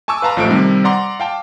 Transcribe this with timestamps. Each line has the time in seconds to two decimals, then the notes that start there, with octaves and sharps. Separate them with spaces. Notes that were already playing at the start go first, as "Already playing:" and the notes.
0.08 G#5 A5 C#6 D6 E6
0.22 B4 F5 A5 A#5 C6
0.37 A1 F3 A3 D7
0.49 C3 D#3 G3
0.84 D5 F#5 A#5 C6 D6
1.20 F5 G5 A5